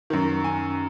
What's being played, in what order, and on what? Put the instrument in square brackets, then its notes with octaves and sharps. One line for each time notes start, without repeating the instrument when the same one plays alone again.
[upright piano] F#2 D#3
G#5